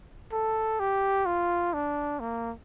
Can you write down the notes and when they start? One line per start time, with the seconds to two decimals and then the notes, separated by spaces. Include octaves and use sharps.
0.32 A4
0.80 G4
1.26 F4
1.73 D4
2.20 A#3